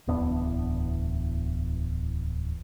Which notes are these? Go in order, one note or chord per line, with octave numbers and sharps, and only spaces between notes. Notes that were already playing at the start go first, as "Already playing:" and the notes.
D1 E2 B3 D4